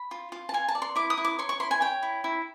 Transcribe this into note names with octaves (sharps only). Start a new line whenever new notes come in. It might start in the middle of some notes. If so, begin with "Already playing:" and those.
Already playing: B5
F4
F4
A5
F4 G#5
A5
D5
C6
E4 D6
D#6
E4
D6
C#5 C6
C#6
E4 C6
G#5
C#5 G5
E4
E4